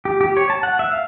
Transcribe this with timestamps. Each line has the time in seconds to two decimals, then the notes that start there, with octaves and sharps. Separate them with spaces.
0.05 G4
0.21 G4
0.37 C#5
0.50 A5
0.63 F#5
0.79 E5
0.92 F5